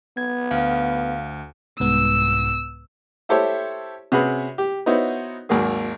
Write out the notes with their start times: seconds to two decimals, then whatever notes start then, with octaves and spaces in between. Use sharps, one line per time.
0.17 B3 G#6
0.51 D2 F5
1.80 C2 G#2 B3 E6
3.29 E4 G4 A4 C5 C#5 E5
4.12 C3 C#4 F#4 G#4 B4 B5
4.58 G4
4.86 B3 D#4 E4 F#4 C5 C#5
5.49 G#1 D#2 F#3 A#3 G#4